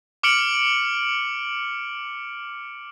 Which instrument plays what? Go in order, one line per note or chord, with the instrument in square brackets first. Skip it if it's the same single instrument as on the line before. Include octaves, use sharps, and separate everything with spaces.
[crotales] D6 F6 C#7 D7 F#7